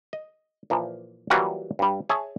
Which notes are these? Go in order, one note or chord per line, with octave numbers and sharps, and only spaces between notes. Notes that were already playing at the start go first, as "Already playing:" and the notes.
D#5
A#2 E3 F3
E3 F#3 G3 A#3 F4 F#4
G2 G3
G#4 C#5 E5 G#5 A5